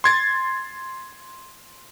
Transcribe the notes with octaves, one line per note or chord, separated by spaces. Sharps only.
C6 G#6 A6